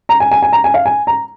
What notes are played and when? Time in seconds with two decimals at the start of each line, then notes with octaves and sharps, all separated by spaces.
0.09 A#5
0.20 G#5
0.31 G#5
0.42 G#5
0.53 A#5
0.64 G#5
0.74 F5
0.86 G#5
1.07 A#5